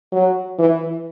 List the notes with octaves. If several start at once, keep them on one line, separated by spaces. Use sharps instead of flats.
F#3
E3